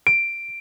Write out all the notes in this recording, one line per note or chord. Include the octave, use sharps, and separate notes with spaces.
D7